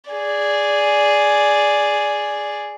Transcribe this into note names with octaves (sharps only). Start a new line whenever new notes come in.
G#4 D5